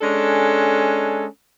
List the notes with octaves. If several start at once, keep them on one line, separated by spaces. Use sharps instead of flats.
G#3 C#4 D4 A4